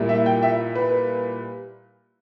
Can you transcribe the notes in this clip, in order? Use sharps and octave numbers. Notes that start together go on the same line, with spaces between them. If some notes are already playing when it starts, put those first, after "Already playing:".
Already playing: A#2 G3 A#3 E4
E5
G5
E5
B4